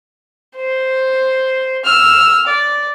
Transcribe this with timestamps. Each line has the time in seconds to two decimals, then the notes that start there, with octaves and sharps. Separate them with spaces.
0.57 C5
1.85 E6 F6
2.47 D5